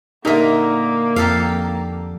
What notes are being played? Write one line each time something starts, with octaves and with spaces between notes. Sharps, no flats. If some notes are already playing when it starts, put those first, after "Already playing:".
A#2 D3 A#3 D#4 A#4 E5
F2 G4 A4 F5